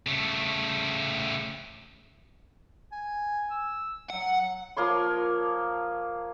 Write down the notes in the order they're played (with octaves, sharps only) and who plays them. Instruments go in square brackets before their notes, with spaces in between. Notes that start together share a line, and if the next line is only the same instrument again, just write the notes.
[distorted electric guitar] C#3 A3
[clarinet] G#5
E6
[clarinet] F#3 [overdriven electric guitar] F#5
[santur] F3 A#3 C#5 C6